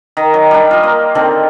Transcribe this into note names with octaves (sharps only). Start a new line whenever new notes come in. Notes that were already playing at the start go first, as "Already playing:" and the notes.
D#3
F#3
G3 D4
F4 D#5
A#3
D3 D#3 C4 A4